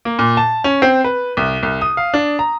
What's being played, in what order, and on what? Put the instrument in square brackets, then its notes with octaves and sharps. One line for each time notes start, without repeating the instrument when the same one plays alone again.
[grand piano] A#3
A#2
A5
C#4
C4
B4
C2
C2
D#6
F5
D4
A#5